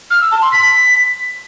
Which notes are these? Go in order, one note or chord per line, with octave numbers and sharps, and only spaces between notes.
F6
E6
A5
C6
B6